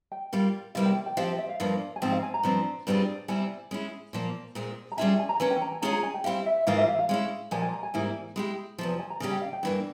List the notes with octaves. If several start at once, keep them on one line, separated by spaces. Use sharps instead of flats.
G5
G3 A#3 F4
E2 C3 G3 A#3 E4 F5
G5
G5
F3 C4 G4 F5
E5
E5
F5
G2 F3 A#3
G#5
G#2 F3 C4 F4 G5
F5
G#5
A#5
G2 F3 C4
G2 G3 C4 F4 G#4
C3 G3 C4 E4 G#5
G#3 C#4 E4
A#2 F3 A#3
A#2 G#3 C4
A#5
G3 C#4 F4 G#4 E5 G#5
G#5
G#5
A#5
E3 A#3 C#4 G#5
G5
A#5
G#5
G#3 C#4 F4 G#4 C#5 A#5
A#5
G#5
G5
G3 C4 E4 G4 F5
E5
G#2 E3 A#3 F4 C5 F5
E5
F5
F5
G#3 C#4 E4
A#2 F3 A#3 G#5
G#5
A#5
G#5
G#2 E3 G3 A#3 E4
G#3 E4 G4
E2 C3 F3
G#5
G#5
A#5
C#3 G3 C#4 G4 G#5
G5
F5
G5
G2 E3 A#3